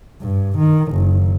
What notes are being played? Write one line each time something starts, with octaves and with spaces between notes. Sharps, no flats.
G2
D#3
F#1